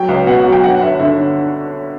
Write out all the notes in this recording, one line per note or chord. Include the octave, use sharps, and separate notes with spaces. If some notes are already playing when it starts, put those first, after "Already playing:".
Already playing: F#3 G5
C#2
B2 F#5
F#3
G5
G1 F#5
G1 E5
D3 E5